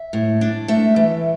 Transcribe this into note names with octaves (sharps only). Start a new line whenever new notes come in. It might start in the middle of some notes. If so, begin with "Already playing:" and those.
Already playing: E5
A2
D4
A3 E5
E3